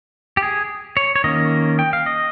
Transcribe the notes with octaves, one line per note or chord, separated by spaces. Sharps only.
G4
G#4
C#5
C#5
D#3 A#3 C#4 D#5
G5
F5
D#5